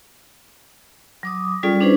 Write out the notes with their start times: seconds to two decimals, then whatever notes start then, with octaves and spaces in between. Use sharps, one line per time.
1.23 F#3 D6 D#6
1.63 G3 C#4 F4 G#4 A4 D5
1.80 C#4 D4 E4 G#4 B4 C5